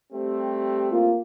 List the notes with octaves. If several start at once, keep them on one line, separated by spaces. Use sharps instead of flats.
G3 A3 C4 G4
A#3 F4